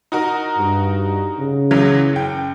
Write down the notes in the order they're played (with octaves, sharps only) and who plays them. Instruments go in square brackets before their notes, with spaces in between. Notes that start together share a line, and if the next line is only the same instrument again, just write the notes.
[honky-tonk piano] D#4 F#4 A#4
[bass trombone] G2
C#3
[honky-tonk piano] C#2 E3 F#3
F#1 G5